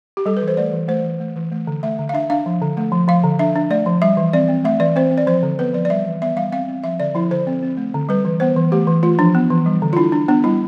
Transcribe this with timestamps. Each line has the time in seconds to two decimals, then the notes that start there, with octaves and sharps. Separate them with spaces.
0.17 G4
0.26 G3 A4
0.37 B4
0.42 E3
0.48 C5
0.57 A3 D5
0.73 E3
0.88 A3 C5
1.04 E3
1.20 A3
1.36 E3
1.51 A3
1.67 D3
1.83 A3 E5
1.98 D3
2.09 F5
2.14 D4 E5
2.30 D4 F5
2.46 F3
2.62 D3
2.77 A3
2.92 F3
3.08 F3 F5
3.23 D3
3.39 D4 E5
3.56 D4
3.70 A3 D5
3.86 F3
4.02 G3 E5
4.17 E3
4.33 C4 D5
4.48 C4
4.64 A3 E5
4.80 E3 D5
4.96 C4 C5
5.11 C4
5.18 D5
5.27 F3 C5
5.43 D3
5.59 B3 B4
5.74 F3 D5
5.85 D5
5.90 G3 E5
6.05 E3
6.21 B3 E5
6.36 G3 F5
6.52 C4 F5
6.68 C4
6.84 F3 E5
7.00 D3 D5
7.15 F3 E4
7.31 D3 C5
7.47 C4
7.63 C4
7.77 A3
7.94 D3
8.09 G3 B4
8.25 E3
8.40 B3 C5
8.56 E3
8.72 A3 G4
8.87 E3
9.03 A3 F4
9.19 F3 D4
9.35 B3
9.50 E3
9.66 G3
9.82 D3
9.93 F4
9.97 D4 E4
10.12 D4
10.28 B3 D4
10.44 G3 E4